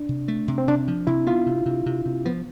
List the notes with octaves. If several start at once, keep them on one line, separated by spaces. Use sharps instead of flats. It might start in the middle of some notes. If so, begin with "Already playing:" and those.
Already playing: D4
C3
A3
C3
C4
C3 D4
F3
C3 E4
B3 F4
C3
C3
C3
C3
F3 B3